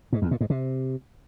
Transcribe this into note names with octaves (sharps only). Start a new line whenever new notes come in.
G#2
E2
A#2
G#2
C3